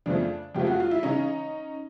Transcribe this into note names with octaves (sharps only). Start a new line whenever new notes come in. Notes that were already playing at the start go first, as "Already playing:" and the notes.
F2 C#3 F3 A3 D4
F2 C#3 F3 A3 G4
F#4
F4
E4
C#3 E3 C#4 D#4